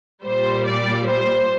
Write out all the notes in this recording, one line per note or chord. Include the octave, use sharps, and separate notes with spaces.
A#2 G3 C5
D5
C5